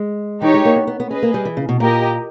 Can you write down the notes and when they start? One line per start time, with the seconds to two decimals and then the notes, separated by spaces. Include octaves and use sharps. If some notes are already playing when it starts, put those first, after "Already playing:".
Already playing: G#3
0.42 E3 D#4 G4 C#5
0.54 G#3
0.65 A#3
0.76 B3
0.87 B3
1.00 B3
1.11 C#4 G#4 B4 D#5
1.23 A#3
1.34 G3
1.45 E3
1.57 C#3
1.69 B2
1.80 A#2 G4 A#4 D#5